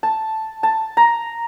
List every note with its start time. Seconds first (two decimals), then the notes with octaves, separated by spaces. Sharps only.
0.03 A5
0.63 A5
0.97 A#5